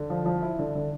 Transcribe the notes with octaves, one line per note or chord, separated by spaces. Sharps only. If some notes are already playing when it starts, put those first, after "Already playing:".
Already playing: D3
F3
F3
E4
D3
D3